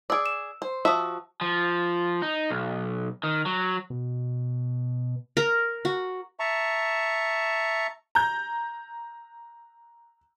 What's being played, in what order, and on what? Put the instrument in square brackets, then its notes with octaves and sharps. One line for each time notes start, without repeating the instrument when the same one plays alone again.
[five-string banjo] G#4 D5 [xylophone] E6 D7
[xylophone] E7
[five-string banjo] C5
[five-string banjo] F3 F#4 E5 [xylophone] A5 D#6
[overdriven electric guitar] F3
D#4
B1
D#3
F#3
[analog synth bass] B2
[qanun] A#4
F#4
[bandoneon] E5 A5 A#5 C#6
[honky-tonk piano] A#5 G6